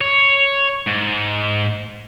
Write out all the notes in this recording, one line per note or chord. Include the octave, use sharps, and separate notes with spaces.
C#5
G#2